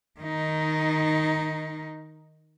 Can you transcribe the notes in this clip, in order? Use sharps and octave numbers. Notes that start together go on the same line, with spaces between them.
D#3 D#4